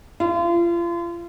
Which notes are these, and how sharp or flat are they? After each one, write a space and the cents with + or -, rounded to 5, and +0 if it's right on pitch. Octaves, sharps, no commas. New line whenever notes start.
F4 -35